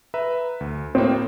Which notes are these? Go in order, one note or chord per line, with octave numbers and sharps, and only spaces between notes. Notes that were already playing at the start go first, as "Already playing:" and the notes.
B4 E5 A#5
D2
A2 A#3 C4